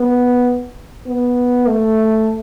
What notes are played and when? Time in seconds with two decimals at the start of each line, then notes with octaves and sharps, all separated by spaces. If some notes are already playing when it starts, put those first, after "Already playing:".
Already playing: B3
1.07 B3
1.67 A3